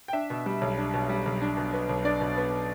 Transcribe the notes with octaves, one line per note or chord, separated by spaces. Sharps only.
G5
D4 E5
B2
G3
B1
D4
B2
G3
B1
D4
B2
B3
B1
D4 D5
B2
B3